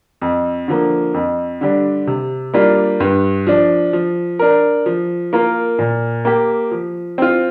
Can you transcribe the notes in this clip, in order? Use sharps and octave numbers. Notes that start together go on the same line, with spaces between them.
F2
D3 F3 A#3
F2
D3 G3 D4
C3
G3 A#3 D4 F4
G2
F3 D4
F3
D4 A#4
F3
A#3 F4 A#4
A#2
A#3 G4
F3
C4 F4